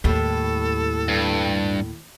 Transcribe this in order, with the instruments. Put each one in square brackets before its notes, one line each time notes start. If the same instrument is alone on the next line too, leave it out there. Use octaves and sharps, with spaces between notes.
[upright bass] D#2 [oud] A2 G3 [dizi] A4
[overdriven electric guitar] G2